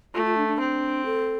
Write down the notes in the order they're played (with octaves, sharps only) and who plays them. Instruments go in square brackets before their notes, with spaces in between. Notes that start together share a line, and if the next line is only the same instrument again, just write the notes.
[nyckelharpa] A3 [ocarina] F4
[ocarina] F4
D4
D4
[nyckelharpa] C4
[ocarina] A4